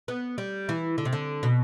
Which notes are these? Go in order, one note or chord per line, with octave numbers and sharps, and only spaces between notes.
B3
G3
E3
D3
C3
D3
B2